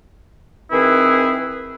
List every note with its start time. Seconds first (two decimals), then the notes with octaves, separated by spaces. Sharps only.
0.72 D#3 C4 E4 G#4 B4